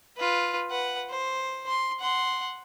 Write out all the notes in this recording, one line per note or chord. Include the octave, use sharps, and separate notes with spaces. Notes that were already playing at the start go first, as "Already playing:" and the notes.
F4 B4
B4 F#5
C5
C6
F#5 C6